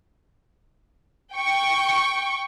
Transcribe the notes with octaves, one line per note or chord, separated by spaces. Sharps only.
G5 C#6